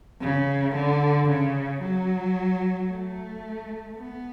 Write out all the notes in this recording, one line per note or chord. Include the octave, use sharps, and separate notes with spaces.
C#3
D3
C#3
F#3
A3
B3